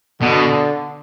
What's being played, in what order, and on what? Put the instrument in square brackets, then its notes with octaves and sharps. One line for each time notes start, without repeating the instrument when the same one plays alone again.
[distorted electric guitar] B2 [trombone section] D3